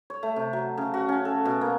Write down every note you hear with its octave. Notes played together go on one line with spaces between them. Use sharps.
C#5
A3
C3
F#3
C#3
F#4
C#4
A4
B2
A#3